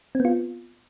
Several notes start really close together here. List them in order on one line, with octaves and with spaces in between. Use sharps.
C4 B3 F4